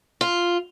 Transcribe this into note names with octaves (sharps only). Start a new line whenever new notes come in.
F4